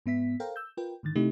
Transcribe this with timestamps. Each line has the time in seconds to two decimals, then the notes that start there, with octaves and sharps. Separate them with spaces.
0.06 G#2 B3 E5 B6
0.40 A4 A#4 C5 F5 G5 A#5
0.56 E6 G6
0.77 F4 A#4 B4 G5
1.03 G#2 D3 D#3 A6
1.16 C3 A3 D#4 E4 G4